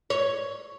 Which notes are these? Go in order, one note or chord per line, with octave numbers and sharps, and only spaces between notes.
C#5